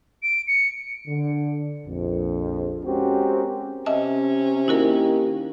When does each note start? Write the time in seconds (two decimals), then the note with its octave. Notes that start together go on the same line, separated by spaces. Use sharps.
0.23 D7
0.47 C#7
1.07 D3
1.86 A#1 F2
2.85 G#3 C4 C#4 F#4 G4 A#4
3.86 C3 C#4 D#5 E5 A5
4.68 D#3 A#3 E4 F#4 G4 A#4